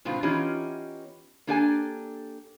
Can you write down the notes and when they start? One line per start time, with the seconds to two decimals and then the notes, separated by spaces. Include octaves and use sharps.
0.05 G#2 B2 D3 C4 F4
0.23 E3 B3 C#4 D#4 F4 G4
1.47 A#3 D4 G4 A4 D#5 G#5